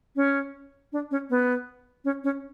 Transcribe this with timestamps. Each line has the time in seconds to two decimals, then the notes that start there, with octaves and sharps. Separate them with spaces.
0.16 C#4
0.92 D4
1.11 C#4
1.30 B3
2.05 C#4
2.24 C#4